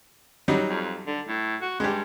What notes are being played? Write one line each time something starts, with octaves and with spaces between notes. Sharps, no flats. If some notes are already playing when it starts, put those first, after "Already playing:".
F#3 G3 D#4
F2
D3
A2
F#4
G2 G#3 G4